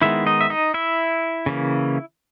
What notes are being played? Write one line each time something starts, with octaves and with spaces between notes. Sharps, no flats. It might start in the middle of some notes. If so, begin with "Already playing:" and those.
D#3 G#3 B3 E4 E5
D#4 D#5
E5
D#4 D#5
E4 E5
C#3 E3 A#3